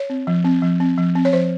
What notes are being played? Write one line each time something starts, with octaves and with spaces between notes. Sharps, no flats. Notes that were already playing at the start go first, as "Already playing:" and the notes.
Already playing: C#5
C4
F3
C4
F3
C4
F3
C4
C#5
F3 C5